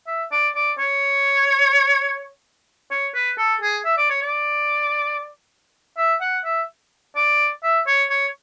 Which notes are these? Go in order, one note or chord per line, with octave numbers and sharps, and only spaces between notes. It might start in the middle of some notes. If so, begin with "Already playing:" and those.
E5
D5
D5
C#5
C#5
B4
A4
G#4
E5
D5
C#5
D5
E5
F#5
E5
D5
E5
C#5
C#5